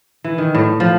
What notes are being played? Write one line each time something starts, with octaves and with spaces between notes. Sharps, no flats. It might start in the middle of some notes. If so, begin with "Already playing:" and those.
E3
D#3
A2
F3